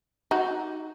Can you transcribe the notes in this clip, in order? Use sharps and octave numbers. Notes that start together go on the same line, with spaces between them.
D#4 F#4